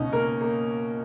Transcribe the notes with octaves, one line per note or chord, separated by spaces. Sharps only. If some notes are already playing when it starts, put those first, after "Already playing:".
Already playing: C#2 B2 C#4 D#4
A#3 A#4
A#3